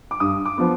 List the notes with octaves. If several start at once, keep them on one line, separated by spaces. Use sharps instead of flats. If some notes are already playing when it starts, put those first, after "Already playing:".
D6
G2 D#6
D6
F3 B3